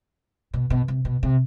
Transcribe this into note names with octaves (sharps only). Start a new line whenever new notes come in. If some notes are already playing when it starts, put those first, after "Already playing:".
B2
B2
C3
B2
C3